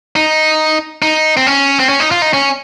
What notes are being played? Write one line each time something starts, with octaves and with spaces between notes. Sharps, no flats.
D#4
D#4
C4
C#4
C4
C#4
D#4
F4
D#4
C#4